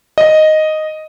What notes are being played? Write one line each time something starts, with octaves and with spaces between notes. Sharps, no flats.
D#5